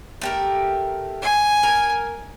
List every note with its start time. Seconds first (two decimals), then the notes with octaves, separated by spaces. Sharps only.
0.21 A3 G4 A#4
1.22 G#5
1.63 A#4